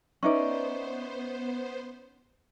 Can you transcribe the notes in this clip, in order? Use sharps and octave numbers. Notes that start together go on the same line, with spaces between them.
B3 C#4 D#4 B4 C5 D5 E5 C#6